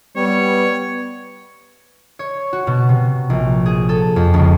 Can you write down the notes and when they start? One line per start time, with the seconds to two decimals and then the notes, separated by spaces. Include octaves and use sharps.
0.16 G3 B3 C#5
2.19 C#5
2.53 F#4
2.67 B2
2.89 C3
3.30 A#1
3.66 G#4
3.89 A4
4.16 F2
4.34 C#2